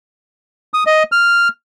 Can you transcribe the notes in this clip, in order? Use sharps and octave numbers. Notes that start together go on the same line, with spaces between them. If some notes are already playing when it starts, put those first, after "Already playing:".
D#6
D#5
F6